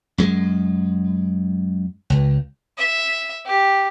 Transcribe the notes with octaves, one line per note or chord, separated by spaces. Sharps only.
F#2 G#3
C#2
E5
G4